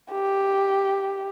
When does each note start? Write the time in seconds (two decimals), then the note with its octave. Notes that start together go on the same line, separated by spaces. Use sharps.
0.12 G4